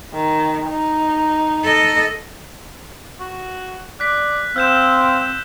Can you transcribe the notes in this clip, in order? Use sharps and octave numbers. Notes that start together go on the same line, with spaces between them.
D#3
D#4
A4 D#5
F#4
D5 F#6 B6
C4 F5 E6 G6 E7